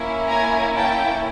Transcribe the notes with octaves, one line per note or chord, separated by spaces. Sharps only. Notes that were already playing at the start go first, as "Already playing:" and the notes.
Already playing: A#3 C#4 E4
G#5 A#5
G5 A5